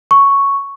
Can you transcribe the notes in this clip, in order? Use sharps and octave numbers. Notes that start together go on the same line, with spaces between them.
C#6